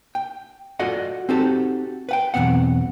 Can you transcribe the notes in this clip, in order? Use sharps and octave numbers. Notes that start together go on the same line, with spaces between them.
G5
F4 F#4 A4 D5 D#5 F#5
C4 D#4 F#4 G4 A4
B4 F#5 G5
B1 E2 A#2 B3 C4 F#5